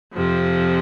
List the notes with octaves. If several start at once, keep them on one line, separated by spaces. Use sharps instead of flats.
F2 C3 F3